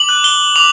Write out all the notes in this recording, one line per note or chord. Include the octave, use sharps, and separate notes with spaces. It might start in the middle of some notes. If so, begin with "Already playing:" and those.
Already playing: D6 F#7
F#6
G7
D6 F7